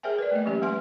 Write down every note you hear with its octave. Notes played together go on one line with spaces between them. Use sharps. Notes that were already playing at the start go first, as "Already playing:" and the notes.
G#4 A#4 C5 E5 G5 G#5
B4 D5
A3 A#3 D#5
E3 F#3 A#3 C#4 G4
F#3 G#3 B4 E5 G#5 C6